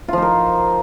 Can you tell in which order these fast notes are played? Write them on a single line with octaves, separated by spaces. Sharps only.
F4 F3 D#4 A#4